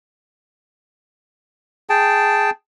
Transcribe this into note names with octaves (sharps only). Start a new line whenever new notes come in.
G#4 G5 A5